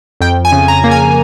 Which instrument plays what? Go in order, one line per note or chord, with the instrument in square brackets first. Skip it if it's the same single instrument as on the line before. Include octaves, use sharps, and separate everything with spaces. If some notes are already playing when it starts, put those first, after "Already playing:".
[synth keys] F2 G5
G#5
C#3
A#5
A#3
G#5